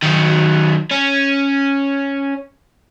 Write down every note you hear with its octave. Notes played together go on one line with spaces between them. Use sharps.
D#3 F#3
C#4